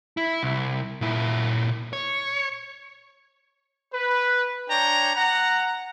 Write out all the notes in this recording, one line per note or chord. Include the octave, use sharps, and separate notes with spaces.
E4
C2
A#2 E4
C#5
B4
D4 C#5 G5 A#5
F#5 A#5